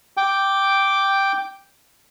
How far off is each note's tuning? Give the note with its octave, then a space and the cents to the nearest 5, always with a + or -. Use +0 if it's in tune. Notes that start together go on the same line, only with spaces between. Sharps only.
G5 +0 D6 +0